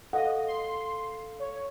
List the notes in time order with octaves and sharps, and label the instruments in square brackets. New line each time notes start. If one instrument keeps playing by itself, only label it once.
[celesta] A4 F5 [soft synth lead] D#5 [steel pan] F#5
[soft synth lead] C6
C#5